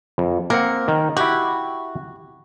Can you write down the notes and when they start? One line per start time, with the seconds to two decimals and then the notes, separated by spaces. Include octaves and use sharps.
0.18 F2
0.50 A#3 C4 A#4 F#5
0.88 D#3
1.17 E4 F#4 G4